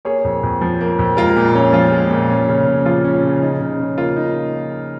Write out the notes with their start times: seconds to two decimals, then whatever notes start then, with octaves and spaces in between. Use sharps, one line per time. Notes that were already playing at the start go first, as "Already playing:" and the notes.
0.05 A#3 G#4 C#5
0.25 F2
0.43 F2
0.61 F3
0.81 A#3
0.99 F2
1.17 G#3 F4 A#4
1.36 A#2
1.55 C#4
1.73 F3 F4
1.92 G#3
2.11 A#2
2.30 C#4
2.48 C#3
2.67 C#3
2.85 F3 F4
3.05 C#4
3.23 C#3
3.42 D#4
3.61 C#3
3.79 C#3
3.97 A#3 F4
4.16 D#4